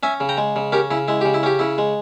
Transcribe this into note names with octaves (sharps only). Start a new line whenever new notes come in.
C#4 E5 G#5
C#3
G5 A#5
G#3
C#3
C#4 G4 A#4
C#3 E4
G#3 E4
C#3 G4
E4
C#4 G4
C#3 E4
G#3